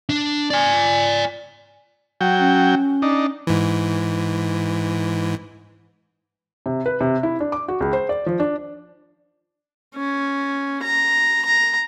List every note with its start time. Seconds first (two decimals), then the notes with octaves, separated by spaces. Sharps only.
0.09 D4
0.50 D5 G#5
2.21 F#3 G5
2.40 C#4
3.02 D4 D#4
3.47 G#2 E3
6.66 C3
6.86 B4
7.01 C3
7.23 E4
7.40 D4
7.52 D6
7.68 F#4
7.80 C#2
7.93 C5
8.09 D5
8.26 F3
8.40 D4
9.96 C#4
10.83 A#5
11.45 A#5